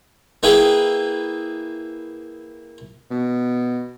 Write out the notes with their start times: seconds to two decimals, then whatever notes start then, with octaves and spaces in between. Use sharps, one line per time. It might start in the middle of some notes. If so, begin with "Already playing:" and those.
0.43 A#3 E4 G#4 B4 G5
3.11 B2